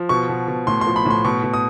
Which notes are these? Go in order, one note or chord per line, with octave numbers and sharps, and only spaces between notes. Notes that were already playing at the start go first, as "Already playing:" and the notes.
Already playing: F3
B2 C#6
B2
B2
A2 C6
C6
F3
B5
A2
C6
B2 C#6
B2
D#6